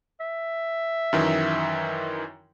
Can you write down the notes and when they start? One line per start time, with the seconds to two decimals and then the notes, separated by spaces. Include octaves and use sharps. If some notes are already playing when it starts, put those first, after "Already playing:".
0.20 E5
1.13 F#2 D#3 E3